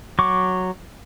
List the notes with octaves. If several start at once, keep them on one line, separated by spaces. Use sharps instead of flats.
F#3 C#6 D6